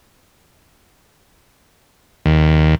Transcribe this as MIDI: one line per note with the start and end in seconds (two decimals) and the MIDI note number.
2.26 2.75 39